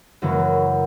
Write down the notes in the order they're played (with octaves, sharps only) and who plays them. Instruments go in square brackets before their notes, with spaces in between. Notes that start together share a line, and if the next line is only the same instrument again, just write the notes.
[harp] F#2 C#3 E3 A#3